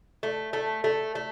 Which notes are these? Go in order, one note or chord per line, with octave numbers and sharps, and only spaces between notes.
A3
A3
A3
A3